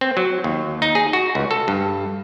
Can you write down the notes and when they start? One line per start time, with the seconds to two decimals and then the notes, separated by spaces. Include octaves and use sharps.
0.01 C4
0.17 F#3
0.44 D#2
0.82 D#4
0.95 G#4
1.13 F#4
1.35 C#2
1.51 A4
1.68 G2